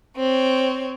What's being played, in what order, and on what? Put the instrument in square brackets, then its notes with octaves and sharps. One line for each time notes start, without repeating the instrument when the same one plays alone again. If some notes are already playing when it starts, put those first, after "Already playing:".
[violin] C4 C#5